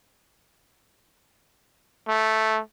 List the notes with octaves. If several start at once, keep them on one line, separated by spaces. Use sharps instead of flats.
A3